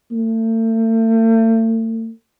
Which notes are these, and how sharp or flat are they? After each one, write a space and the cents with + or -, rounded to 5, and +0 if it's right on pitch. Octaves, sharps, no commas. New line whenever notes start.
A3 +40